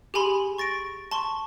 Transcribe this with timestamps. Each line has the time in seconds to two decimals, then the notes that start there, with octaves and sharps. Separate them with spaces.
0.14 G4 G#4 G#5 B5 C6
0.58 C#6 A6 A#6 D7
1.11 A5 C6 C#6